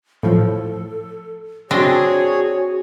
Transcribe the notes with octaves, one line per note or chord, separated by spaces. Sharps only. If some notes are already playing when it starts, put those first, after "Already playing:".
A2 F3 A4
C4 D4 F#4 G#4 C#5 D#5